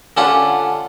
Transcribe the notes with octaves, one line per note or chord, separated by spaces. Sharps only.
D3 C#4 D4 F4 G4 F#5